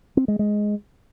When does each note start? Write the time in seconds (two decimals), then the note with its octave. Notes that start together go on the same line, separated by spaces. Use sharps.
0.17 C4
0.28 G#3
0.39 G#3